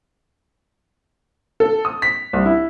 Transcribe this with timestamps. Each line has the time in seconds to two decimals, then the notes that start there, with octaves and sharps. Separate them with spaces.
1.60 A4
1.85 D#6
2.02 B6
2.33 C2
2.46 E4